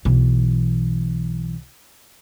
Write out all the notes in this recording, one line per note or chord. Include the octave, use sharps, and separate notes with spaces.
B1 E3